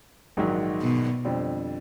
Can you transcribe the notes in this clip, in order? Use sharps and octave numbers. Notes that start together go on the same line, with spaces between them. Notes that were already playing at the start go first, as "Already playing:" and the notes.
A#1 G#2 D#3 F#3
B2
F2 D3 G3 C4